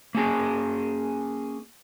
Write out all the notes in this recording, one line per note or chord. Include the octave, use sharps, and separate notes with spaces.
A#3 C#4 G#4